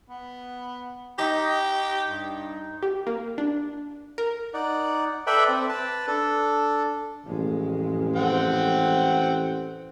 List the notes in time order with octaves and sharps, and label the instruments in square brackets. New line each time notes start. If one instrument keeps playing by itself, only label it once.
[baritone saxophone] B3
[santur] D#4 D#5 [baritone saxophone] G4
[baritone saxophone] G2
[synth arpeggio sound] G4
A#3
D4
A#4
[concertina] D#4 D5 F#5
A4 B4 D5 E5 G5 B5
C4
B4 A5
D4 A4
[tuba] A1 [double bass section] F2 A2 G#3
[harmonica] C4 F#5 G5